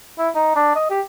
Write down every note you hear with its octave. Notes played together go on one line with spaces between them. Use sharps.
E4
D#4
D4
D#5
G4